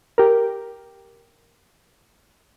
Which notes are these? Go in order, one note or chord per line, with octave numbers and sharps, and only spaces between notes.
G4 A#4